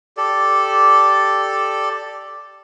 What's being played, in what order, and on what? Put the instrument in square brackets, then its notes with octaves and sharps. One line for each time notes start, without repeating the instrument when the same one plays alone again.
[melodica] G4 A4 D5